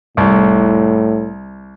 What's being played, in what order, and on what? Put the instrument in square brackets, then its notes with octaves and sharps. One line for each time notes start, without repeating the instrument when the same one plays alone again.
[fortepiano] C2 [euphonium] A2